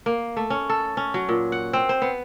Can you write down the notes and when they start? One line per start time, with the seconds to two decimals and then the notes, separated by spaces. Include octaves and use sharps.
0.06 A#3
0.37 A3
0.50 C#4
0.69 A4
0.97 C#4
1.14 F#3
1.29 A#2
1.52 F#5
1.73 C4
1.89 C5
2.02 B3